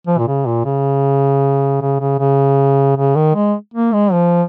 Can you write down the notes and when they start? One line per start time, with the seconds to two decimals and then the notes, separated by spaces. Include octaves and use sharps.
0.07 F3
0.18 A#2
0.28 C#3
0.46 A#2
0.65 C#3
1.82 C#3
2.00 C#3
2.20 C#3
2.97 C#3
3.16 D#3
3.35 G#3
3.74 A#3
3.93 G#3
4.13 F3